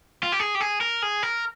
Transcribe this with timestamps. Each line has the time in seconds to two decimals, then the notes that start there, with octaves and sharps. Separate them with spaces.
0.23 F4
0.32 G4
0.40 G#4
0.55 G4
0.61 G#4
0.81 A#4
1.02 G#4
1.23 A#4